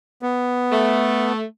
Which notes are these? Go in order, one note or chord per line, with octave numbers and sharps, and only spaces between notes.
B3
A3